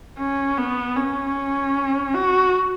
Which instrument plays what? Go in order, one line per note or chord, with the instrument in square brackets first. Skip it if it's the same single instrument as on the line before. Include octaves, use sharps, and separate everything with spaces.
[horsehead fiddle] C#4
B3
C#4
F#4